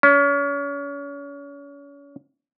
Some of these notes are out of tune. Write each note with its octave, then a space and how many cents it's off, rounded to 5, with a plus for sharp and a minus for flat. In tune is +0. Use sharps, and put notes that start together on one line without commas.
C#4 +35